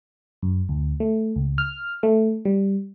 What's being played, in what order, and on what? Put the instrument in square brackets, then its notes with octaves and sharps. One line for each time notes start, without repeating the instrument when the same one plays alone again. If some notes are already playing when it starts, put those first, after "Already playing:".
[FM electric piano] F#2
D2
A3
C#2
F6
A3
G3